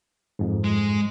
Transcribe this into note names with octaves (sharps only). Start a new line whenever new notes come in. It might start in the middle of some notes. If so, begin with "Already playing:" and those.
F2 G#2
G#3